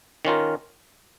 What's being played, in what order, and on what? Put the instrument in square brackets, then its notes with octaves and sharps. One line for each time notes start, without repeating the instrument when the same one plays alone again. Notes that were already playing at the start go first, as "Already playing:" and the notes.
[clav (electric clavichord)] D#3 C#4 F4 A#4